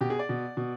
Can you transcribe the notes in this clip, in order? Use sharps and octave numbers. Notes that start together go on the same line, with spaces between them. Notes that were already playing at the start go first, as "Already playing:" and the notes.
B2 G4
G#4
D5
B2
B2